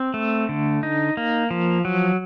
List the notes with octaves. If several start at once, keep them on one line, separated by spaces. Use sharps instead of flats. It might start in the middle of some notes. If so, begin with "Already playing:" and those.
Already playing: C4
A3
D3
D#4
A#3
F3
F#3